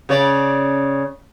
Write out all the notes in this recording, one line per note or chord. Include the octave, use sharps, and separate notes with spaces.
C#3 C#5 D5